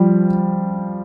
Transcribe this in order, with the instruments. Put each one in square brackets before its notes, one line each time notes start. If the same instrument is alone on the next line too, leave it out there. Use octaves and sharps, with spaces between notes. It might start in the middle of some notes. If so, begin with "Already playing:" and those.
Already playing: [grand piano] F3 G3